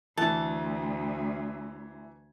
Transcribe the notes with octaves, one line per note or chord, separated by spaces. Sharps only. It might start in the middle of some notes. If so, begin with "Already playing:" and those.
D2 E3 A5